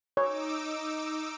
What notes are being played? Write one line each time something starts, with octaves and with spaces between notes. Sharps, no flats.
D#4 C#5 D6 E6